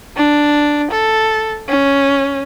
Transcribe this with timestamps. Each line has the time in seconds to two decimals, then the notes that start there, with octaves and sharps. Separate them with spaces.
0.17 D4
0.91 A4
1.69 C#4